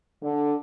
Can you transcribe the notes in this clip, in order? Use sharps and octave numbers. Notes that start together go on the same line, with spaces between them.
D3